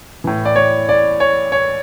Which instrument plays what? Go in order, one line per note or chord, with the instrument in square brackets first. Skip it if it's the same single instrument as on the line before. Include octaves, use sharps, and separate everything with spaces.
[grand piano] A2 E3
D5
C#5
D5
C#5
C#5